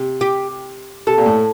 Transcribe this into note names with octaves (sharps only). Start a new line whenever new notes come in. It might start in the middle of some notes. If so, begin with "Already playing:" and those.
Already playing: C3
G4
C3 A4
A#2
A2